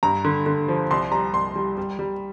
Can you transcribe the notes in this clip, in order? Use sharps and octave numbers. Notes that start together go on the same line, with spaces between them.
G2 A#5
D3
D3
F3
C2 C6
G3 A#5
C2 C6
G3
G3
G3